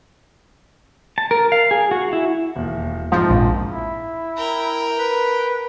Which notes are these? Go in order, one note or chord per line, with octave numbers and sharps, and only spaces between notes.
A5
A#4
F5
G#4
F#4
E4
E1 D#2
E1 F2 G#2 F3
A#1
E4
A#4 G5
B4